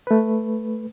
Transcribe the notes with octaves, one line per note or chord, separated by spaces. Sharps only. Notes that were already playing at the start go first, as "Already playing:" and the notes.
A3 B4